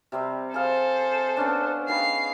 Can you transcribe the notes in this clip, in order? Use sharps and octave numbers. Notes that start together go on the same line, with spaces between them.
C3 G3 C4
G#4 A4 C5 F5
B3 C#4 D4
D#3 G#4 F5 B5 C7